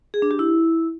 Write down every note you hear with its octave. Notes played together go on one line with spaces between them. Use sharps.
G#4
D4
G4
E4